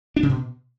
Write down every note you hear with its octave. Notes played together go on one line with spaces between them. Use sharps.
D4
C#3
B2